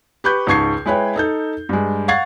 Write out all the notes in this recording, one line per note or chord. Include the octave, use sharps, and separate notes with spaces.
G4 B4 C#6 G6
C#2 G#2 A5 C#6 G#6 C7
G#3 E4 B4 C#5 G5
D#4 A4 G6
G2 G#3
F5 F#5 C#6 G#6 A6 C7